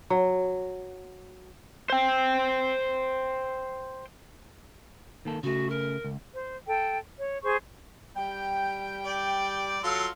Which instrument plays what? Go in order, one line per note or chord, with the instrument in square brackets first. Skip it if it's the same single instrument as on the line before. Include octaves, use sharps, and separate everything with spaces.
[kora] F#3
[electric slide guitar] C5 G5
[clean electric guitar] D#3 A#3 A4
[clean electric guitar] C#3 A3 [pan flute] F#4
[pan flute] A#4
[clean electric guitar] C#2
[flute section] C5
A4 G5
C#5
G#4 C5 C#6
[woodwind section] G3 G5
[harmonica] D5
[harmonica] F#3 A4 C6 [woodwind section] F4 F5